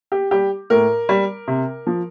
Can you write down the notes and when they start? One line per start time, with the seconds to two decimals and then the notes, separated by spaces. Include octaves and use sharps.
0.12 G4
0.31 G3 G4
0.70 A2 A#4
1.09 G3
1.48 C3
1.87 F3